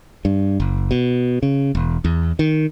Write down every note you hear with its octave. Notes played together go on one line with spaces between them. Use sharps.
G2
F#1
B2
C#3
E1
E2
D#3